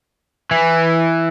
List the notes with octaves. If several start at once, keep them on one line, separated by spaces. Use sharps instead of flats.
E3